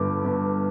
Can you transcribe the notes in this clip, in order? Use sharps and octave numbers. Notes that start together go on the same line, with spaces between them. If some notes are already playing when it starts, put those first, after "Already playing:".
Already playing: G1 G2 D3 D6
G1